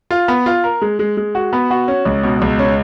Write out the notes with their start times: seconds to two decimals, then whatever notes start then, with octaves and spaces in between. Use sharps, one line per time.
0.11 F4
0.28 B3
0.46 F4
0.64 A#4
0.81 G#3
0.99 G#3
1.17 G#3
1.35 F#4
1.53 B3
1.71 F#4
1.88 C#4
2.05 C#2
2.23 B2
2.42 C#2
2.59 C#4